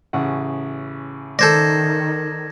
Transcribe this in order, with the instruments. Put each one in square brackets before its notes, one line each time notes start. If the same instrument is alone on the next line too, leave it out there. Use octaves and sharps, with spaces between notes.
[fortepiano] A1 C#3 F#5
[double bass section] D#3 [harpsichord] A4 C5 D5 [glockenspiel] G#6 A#6